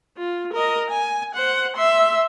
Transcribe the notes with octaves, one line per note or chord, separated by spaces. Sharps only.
F4
A#4 D#5
G#5
C5 F#5
E5 C6